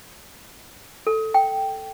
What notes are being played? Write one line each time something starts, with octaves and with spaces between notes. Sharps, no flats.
A4
G5